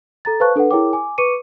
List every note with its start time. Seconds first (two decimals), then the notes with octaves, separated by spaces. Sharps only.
0.25 A4 A#5 A6
0.40 B4 C5 F5 A5 C#6 F#6
0.56 D4 A4 B4 F#5
0.71 E4 G#4 A#4 C#5 G5 D6
0.93 G#5 D6
1.18 B4 C#6 D6 C#7 D#7